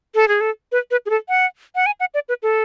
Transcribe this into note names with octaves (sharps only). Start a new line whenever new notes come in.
A4
G#4
A4
B4
B4
G#4
A4
F#5
F#5
G#5
F#5
D5
B4
A4